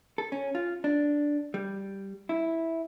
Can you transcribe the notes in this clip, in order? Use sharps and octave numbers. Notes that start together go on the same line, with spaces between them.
A4
C#4
F4
D4
G3
E4